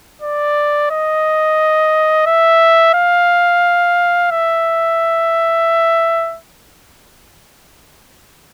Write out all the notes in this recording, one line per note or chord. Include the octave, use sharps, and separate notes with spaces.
D5
D#5
E5
F5
E5